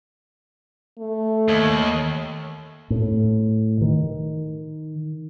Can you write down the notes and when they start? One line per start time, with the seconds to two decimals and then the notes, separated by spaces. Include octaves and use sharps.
0.99 A3
1.48 D#2
2.90 A2
3.81 D#3